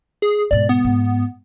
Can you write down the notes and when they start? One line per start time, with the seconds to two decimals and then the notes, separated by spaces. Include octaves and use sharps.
0.22 G#4
0.51 G#2 B2 D5
0.69 B3
0.85 G#2